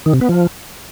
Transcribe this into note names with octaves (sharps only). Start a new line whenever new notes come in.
D#3
C3
B3
F3